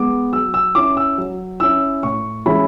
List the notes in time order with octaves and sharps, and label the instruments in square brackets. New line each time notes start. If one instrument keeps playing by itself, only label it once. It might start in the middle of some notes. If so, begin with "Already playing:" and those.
Already playing: [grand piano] G#3 B3 D6
F#3 E6
E6
C#4 E4 D6
E6
F#3
C#4 E4 E6
A2 C#6
E3 G#3 C#4 E4 B5